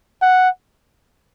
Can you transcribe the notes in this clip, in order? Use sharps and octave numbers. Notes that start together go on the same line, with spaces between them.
F#5